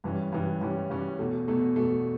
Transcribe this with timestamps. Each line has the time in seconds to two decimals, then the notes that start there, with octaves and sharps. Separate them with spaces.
0.04 G2 E3 G3 C#4
0.32 G2 E3 G3 C#4
0.61 G2 E3 G3 C#4
0.90 G2 E3 G3 C#4
1.19 E2 B2 A3
1.48 E2 B2 A3
1.76 E2 B2 A3